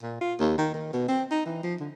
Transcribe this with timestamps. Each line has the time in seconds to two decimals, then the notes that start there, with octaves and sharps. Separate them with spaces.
0.02 A#2
0.21 F4
0.40 D#2
0.58 D#3
0.74 D#3
0.93 B2
1.08 C4
1.31 D#4
1.46 E3
1.64 F3
1.80 D3